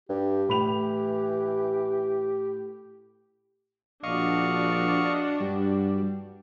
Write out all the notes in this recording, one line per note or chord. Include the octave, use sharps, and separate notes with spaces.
G2 G4
A2 E3 B5 F7
A#1 D4 F#4 D#5 F5 C#6
G2 G3